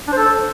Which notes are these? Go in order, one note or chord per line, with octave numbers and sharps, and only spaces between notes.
D4
C5
A4